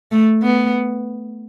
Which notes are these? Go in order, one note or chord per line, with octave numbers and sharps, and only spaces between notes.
A3
B3